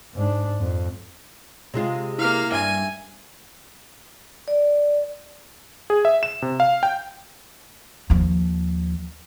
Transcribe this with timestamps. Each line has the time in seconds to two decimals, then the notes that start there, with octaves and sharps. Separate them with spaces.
0.14 G#2 D4
0.60 F2
1.74 C3 G#3 F4
2.18 A#3 E4 F5 F6
2.52 G2 E5 G#5
4.48 D5
5.90 G#4
6.05 E5
6.23 E7
6.42 C3
6.60 F5
6.83 G5
8.10 D#2 F3